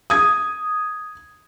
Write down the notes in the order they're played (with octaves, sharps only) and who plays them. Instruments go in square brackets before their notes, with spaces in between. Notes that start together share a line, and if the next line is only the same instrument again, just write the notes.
[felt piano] D#6 G#6